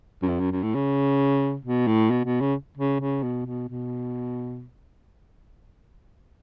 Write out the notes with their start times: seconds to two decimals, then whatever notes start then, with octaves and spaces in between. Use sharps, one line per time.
0.22 F#2
0.28 F2
0.40 F#2
0.52 F#2
0.62 A2
0.74 C#3
1.65 B2
1.87 A2
2.10 B2
2.24 B2
2.40 C#3
2.77 C#3
3.00 C#3
3.23 B2
3.46 B2
3.69 B2